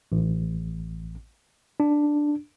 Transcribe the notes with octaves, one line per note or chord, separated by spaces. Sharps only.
A1
D4